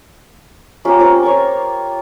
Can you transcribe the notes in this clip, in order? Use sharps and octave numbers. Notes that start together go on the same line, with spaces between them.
A#3 C#4 F4 G4
C4 C#4 F4 A#4
C#5 G5 C6 C#6